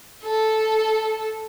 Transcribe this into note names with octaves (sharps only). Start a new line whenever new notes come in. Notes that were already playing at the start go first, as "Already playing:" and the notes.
A4